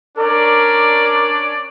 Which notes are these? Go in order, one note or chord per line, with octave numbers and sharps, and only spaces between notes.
C#4 D4 A#4 D5